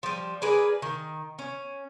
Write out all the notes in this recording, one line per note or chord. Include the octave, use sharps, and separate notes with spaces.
F3 G3
G#4 A#4 B4 D5
D#3
C#4